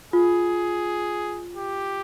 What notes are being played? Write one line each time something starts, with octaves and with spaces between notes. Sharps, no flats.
F4 G#4
G4